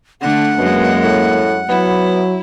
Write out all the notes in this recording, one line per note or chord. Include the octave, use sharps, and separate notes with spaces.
D3 A3 F#5
F#2 B2 G#3 A#3
A2
F#3 B3 E4